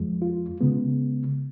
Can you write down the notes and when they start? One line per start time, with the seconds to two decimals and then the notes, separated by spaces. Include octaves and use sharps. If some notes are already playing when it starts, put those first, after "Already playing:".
Already playing: F2 F3 G#3
0.22 F4
0.61 C#3 G#3 B3